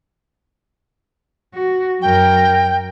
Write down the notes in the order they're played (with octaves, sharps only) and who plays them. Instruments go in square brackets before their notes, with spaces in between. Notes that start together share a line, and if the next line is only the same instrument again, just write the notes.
[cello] F#4
[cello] F#2 A#4 [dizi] G5